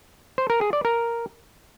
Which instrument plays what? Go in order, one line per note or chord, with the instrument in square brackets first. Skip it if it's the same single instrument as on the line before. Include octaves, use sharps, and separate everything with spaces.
[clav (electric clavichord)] C5
A#4
G#4
D5
A#4